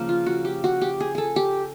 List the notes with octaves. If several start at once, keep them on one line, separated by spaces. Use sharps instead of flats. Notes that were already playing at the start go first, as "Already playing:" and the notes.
Already playing: C#3 F3 A#3
F4
F#4
G4
F#4
G4
G#4
G#4 A4
G4